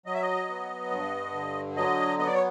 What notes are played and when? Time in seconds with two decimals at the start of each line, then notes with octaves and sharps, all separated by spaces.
0.06 F#3 D#5
0.14 E5
0.21 D#5
0.49 B3
0.90 G2
1.34 D3
1.76 F#3 D#5
2.19 B3 D#5
2.26 D5
2.35 C#5